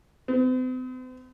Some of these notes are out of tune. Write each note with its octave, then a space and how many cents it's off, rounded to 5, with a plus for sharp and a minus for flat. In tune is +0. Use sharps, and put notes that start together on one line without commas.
C4 -45